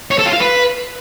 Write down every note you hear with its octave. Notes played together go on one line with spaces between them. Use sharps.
C#5
A4
F4
F5
B4